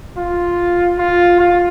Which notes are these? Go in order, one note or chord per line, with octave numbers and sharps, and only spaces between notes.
F4
F4
F4